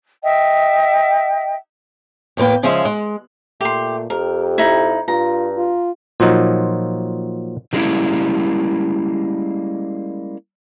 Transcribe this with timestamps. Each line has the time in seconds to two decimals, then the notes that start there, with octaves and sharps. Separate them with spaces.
0.23 D#5 E5 G5
2.37 E2 A2 A#3 B4 G5
2.63 C#3 F3 G#3 C#4 G#4 E5
2.85 G#3
3.61 A#2 A3 G4 C6
4.10 F2 G4 A#4
4.58 D#4 E4
5.08 G2 F4 A#5
5.57 F4
6.20 A#2 F3 F#3 D#4
7.73 D#3 G3 G#3 A#3 C#4 E4